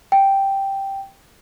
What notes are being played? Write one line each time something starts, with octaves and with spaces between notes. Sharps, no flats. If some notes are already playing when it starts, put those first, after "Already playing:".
G5